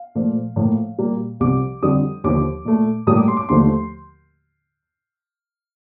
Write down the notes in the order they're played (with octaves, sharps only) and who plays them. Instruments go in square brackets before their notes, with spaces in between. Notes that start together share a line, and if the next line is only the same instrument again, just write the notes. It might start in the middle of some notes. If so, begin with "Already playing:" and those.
Already playing: [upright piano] F5
A#2 F3 A3
A2 F3 A#3
A#2 G3 A#3
C2 C3 F3 D6
F2 D3 G3 D#6
D#2 D3 F3 D6
A#2 A3
A2 G3 A#3 D#6
D6
C6
D6
D#2 D3 F3 A3 C6